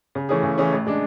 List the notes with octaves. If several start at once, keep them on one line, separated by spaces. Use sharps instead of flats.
C#3
E3 A3 C#4 G#4
C#3
E3 A3 C#4 G#4
A1
G#3 D4